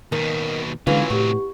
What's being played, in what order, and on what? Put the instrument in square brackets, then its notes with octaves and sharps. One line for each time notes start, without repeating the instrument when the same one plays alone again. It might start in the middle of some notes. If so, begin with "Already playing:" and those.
[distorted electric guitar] D#2 B2 [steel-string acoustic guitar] D#3
[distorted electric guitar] C2 F#3 [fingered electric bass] D3 G#3 [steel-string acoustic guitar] E3 C#4 F4 [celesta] F5
[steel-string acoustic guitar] E2 [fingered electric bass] A2 [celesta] G4 C#6